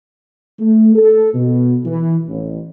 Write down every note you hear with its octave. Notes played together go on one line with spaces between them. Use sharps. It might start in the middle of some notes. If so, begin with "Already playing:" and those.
A3
A4
B2
E3
A1